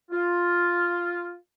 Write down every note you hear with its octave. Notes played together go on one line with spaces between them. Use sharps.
F4